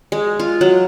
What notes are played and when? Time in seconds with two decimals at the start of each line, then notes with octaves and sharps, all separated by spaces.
0.12 G#3
0.40 F4
0.61 F#3